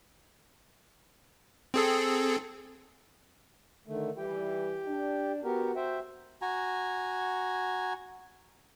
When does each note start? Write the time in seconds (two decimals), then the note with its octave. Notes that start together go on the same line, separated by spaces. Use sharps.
1.74 C4 G#4 A4
3.87 D3 D#3 A3
4.18 E3 G3 G4 G5
4.87 D4
5.44 B3 F#4 G4 A#4
5.76 C5 E5 G5
6.42 F#4 G#5 A#5